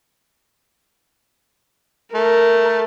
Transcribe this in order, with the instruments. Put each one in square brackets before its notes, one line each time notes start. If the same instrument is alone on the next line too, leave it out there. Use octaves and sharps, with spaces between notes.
[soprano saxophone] A3 [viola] A#4